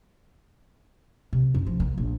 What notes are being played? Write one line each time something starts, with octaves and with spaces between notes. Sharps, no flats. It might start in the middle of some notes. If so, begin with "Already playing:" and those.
C3
F#2
F3
A#3
A#1